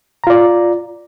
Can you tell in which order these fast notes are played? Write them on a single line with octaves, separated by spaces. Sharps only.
A#5 F4 D5